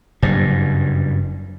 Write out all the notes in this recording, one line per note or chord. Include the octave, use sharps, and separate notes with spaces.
F#1 G2